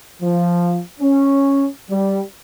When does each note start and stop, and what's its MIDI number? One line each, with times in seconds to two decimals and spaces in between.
0.22 0.79 53
1.00 1.67 61
1.91 2.23 55